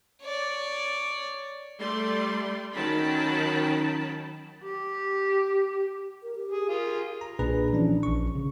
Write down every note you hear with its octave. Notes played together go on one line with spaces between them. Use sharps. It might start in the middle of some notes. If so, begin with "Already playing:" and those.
C#5 D5
G3 A3 D5 C6
D#3 F#3 C#4 G5 A5 B5
G4
A#4
G4
G#4
F4 G#4 A#4
A#5
B1 A#2 D4 G#4 B4 A#5
E3 F3 C#4 D4
A#1 C#6
C#3